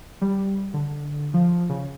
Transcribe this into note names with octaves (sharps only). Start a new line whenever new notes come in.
G3
D3
F3
C#3